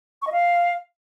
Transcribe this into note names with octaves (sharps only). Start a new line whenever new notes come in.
C#6
D#5
F5